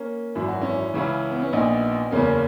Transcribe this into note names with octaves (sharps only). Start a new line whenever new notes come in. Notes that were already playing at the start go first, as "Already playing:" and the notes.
Already playing: A#3 C#4
G#1 F#2 E3 E4
F#4
C#4 E4
C#2 C#3 E3 C#4 E4
B3
C#4
A#1 A#2 B3 D#4
F#1 E2 C#3 E3 A#3 C#4